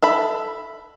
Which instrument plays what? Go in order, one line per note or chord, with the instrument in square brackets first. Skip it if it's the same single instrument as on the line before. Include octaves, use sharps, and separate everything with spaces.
[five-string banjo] A4 E5 B5